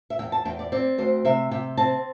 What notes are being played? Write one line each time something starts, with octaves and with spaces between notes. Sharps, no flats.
E5
E2 G5
A5
E2 G5
D5
C4 D5
D2 C5
C3 E5
C3 G5
C4 A5